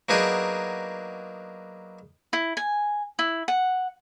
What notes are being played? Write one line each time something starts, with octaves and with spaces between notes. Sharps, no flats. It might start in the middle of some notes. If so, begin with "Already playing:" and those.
F#3 A#3 B3 D4 D#4 G#4
E4
G#5
E4
F#5